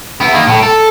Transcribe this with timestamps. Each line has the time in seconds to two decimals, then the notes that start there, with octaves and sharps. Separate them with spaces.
0.21 B3 E4
0.33 D#3 A#3
0.49 A2
0.63 A4